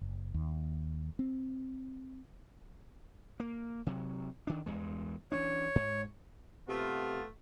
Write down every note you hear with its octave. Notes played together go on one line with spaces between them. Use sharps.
F#1
D#2
C4
A#3
C3 F#3
D#3 D4
E2 G2 G#3
E3 C#4 D4 C#5
G#2
C3 A3 B3 F4